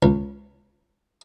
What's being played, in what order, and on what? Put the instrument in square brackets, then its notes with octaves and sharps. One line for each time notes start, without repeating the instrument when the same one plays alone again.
[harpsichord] C#2